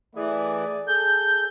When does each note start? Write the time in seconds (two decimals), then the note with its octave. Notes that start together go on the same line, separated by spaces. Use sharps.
0.15 E3 A3 G#4 D5
0.88 G#4 A4 G6